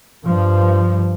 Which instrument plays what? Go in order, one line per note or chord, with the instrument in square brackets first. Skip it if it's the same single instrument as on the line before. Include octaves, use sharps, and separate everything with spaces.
[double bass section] G2 F3